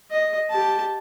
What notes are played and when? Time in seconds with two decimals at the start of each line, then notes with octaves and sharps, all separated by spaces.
0.11 D#5
0.50 G4 A5